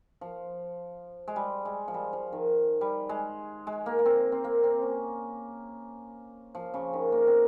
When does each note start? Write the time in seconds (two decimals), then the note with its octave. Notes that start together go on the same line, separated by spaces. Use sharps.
0.21 F3
1.28 G#3
1.36 G3
1.65 G#3
1.88 F3
1.94 G3
2.13 F3
2.33 D#3
2.81 G3
3.09 G#3
3.67 G#3
3.86 A#3
3.99 A#3
4.06 C4
4.32 C4
4.44 A#3
4.64 C4
4.82 C#4
6.55 F3
6.74 C#3
6.93 D#3
7.12 A#3
7.27 C4